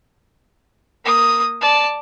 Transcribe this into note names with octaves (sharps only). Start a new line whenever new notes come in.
A#3 D#6
D5 A5